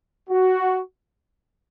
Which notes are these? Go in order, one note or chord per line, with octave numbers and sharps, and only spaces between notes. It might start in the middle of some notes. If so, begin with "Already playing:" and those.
F#4